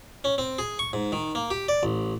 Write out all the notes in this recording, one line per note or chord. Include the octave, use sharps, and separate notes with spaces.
C#4
C4
G#4
C#6
G#2
D#3
A#3
G4
D5
A1